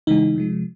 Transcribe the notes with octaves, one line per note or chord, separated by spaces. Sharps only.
C#3 E3 G#3 D#4
C3 F3 G#3